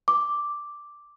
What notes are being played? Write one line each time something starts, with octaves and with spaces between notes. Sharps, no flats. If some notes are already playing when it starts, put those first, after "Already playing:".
D6